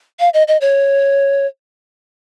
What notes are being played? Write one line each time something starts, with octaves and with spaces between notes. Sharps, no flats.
F5
D#5
D#5
C#5